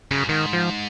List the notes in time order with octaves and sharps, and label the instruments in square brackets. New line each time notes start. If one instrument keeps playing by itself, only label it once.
[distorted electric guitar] F#2 [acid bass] C#3
[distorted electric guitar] G#2 [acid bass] D#3
[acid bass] F3